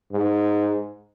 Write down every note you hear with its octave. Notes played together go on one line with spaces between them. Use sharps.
G#2